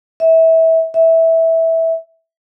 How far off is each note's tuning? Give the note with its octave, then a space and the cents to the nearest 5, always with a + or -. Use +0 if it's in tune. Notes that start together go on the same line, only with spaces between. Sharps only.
E5 -25
E5 -15